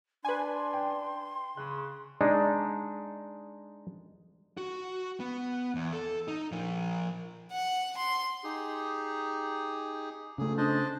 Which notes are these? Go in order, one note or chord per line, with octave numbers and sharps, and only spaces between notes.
D4 B4 G#5 C6
G5
C#3 F#6
G#3 D4 D#4
F#4
B3
E2
A4
D#4
F3 A#4
F#5
C6
D#4 G4 G#4
C#3 A3 G#4
D4 C5 D#5